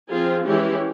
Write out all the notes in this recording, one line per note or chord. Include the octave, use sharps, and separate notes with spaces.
F3 C4 F4 G#4
E3 G#3 C#4 E4 G4